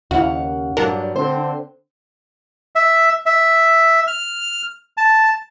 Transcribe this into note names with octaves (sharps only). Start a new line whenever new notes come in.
D#2 C#3 E4 F#4 F5 F#5
G2 F#3 G3 D4 A#4 F#5 A5
D3 C4 C5
E5
E5
F6
A5